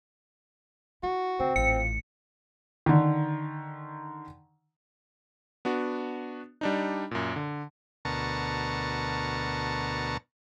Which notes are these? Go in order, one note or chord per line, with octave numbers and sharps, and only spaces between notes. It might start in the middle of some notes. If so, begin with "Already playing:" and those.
E4 F#4
D3 C4
A1 A#2 F4 C#7
D3 D#3
B3 D4 F#4
G3 D4 D#4
F#2 A#2
D3
D2 B2 A#4 A5 C#6